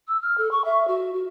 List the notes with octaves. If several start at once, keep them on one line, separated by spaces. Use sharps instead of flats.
E6
F6
A4
C#6
E5
F#4
F#4